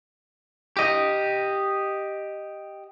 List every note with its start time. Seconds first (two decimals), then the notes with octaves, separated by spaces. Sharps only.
0.77 G4 D#5